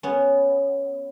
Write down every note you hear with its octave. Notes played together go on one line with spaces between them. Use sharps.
B3 C#4